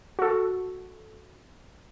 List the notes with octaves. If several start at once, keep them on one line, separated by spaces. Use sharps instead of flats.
F#4 A4